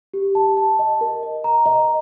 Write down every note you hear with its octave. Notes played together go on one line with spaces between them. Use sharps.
G4
A5
A5
D#5
A#4
D#5
A#5
D#5